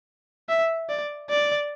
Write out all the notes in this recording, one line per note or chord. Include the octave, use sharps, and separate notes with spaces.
E5
D5
D5